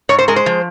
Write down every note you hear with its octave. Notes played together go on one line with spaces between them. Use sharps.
G#2 C#5
C5
G#3 A#4
C5
F3